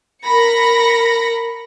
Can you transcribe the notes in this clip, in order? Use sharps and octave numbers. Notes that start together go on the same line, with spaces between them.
A#4 B5 A#6 C#7